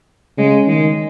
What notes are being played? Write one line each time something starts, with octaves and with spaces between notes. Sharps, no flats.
C#3 G#3
D#3 G#3